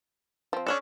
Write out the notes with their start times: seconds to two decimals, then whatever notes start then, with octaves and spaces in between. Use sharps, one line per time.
0.53 F3 C4
0.67 C#4 D4 A4